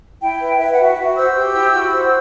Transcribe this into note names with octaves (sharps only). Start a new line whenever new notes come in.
E4 G5
B4
B4 E5
F#5
F#4
E5
F#4
C5 E6
G4
E4
F#4
C5